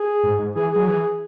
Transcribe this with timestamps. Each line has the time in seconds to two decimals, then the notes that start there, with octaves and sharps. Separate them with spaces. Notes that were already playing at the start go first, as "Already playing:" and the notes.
Already playing: G#4
0.23 G#2
0.39 G#2
0.56 E3 G#4
0.72 F#3 G#4
0.87 E3 G#4